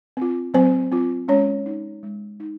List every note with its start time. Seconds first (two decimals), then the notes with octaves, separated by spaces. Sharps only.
0.17 C4 F4
0.54 F#3 C4 C5
0.92 C4 F4
1.28 G#3 C#4 C#5
1.66 D#4
2.03 G#3
2.40 D#4